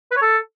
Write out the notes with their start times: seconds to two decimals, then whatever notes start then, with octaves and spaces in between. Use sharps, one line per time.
0.11 B4
0.16 C#5
0.21 A4